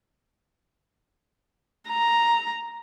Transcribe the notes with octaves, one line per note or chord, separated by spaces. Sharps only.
A#5